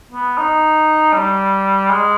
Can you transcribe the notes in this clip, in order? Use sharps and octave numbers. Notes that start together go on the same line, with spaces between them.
B3
D#4
G3
G#3